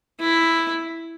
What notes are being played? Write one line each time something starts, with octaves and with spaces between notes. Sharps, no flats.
E4